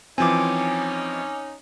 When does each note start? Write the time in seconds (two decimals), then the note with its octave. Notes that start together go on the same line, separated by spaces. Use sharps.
0.18 E3 F3 C4 C#4 D#4 G#5 D6